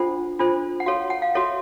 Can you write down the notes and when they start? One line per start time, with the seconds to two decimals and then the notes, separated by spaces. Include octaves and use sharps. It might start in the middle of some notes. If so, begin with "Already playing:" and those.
Already playing: D4 F4 A4 C5 F#5
0.39 D4 F4 A4 C5
0.80 F#5
0.86 F#4 A4 C#5 F5
1.10 F#5
1.22 F5
1.35 F#4 A4 C#5 E5